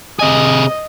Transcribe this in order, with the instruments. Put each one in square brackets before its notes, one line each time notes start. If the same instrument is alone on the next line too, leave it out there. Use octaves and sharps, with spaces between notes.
[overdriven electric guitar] C3 G#4 [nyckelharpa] D#5